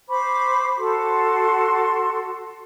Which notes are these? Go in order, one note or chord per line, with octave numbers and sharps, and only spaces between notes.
C5 B5 C#6 D6
F#4 A4 C6